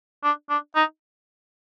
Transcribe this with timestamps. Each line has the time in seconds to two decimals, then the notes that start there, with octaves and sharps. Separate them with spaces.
0.23 D4
0.49 D4
0.75 D#4